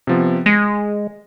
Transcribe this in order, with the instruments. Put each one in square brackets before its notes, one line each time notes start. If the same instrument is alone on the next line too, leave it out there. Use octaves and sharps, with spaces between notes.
[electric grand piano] C3 F3 B3
[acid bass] G#3 [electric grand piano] A#6